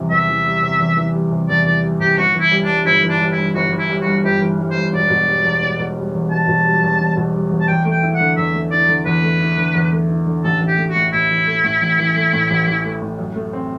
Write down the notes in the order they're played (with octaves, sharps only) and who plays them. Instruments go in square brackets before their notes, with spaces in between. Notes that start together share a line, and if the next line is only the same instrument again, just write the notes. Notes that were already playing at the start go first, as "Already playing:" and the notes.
Already playing: [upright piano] E2 C3 E3 G3
[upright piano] E2 [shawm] E5
[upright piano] E3
G3
C3
E2
E3
G3
C3
[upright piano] E2 [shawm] D5
[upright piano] E3 [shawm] D5
[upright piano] G3
[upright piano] C3 [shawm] G4
[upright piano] G1 [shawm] F#4
[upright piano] E3
[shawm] E4
[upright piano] G3
[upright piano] G2 [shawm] D4
[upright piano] G1 [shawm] E4
[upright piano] E3
[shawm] D4
[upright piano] G3
[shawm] E4
[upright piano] G2
[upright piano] G1 [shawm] F#4
[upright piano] E3
[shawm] E4
[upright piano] G3
[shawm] F#4
[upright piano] G2
[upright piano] G1 [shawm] G4
[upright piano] E3
G3
[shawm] C5
[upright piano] G2
[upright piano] E1 [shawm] D5
[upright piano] B2
G3
E2
E1
B2
G3
E2
[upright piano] E1 [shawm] A5
[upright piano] B2
G3
E2
E1
B2
G3
E2
[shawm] A5
[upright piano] E2 [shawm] G5
[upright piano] A3
[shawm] G5
[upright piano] E4
[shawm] F#5
[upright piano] D3
[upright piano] E2 [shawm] E5
[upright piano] A3
[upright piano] E4 [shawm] D5
[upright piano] D3
[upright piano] E2 [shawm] B4
[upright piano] A3
E4
D3
E2
A3
E4
D3
[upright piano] A1 [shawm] A4
[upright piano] E3
[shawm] G4
[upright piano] A3
[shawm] F#4
[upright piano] A2
[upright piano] A1 [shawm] E4
[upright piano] E3
A3
A2
A1
E3
A3
A2
A1
E3
A3
A2
F#2
A3
C4